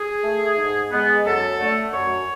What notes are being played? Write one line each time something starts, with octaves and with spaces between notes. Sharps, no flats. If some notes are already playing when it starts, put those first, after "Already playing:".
Already playing: G#4
A3
G#2
G#3 B3
F#2 A4
D3 A3
F#2 C#5